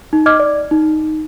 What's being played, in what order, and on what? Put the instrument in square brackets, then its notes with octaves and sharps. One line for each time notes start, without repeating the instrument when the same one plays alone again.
[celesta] D#4
D#5 D6 F6 G#6
D5
D#4